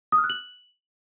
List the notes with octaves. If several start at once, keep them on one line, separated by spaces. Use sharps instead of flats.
D#6
F6
F#6
F#7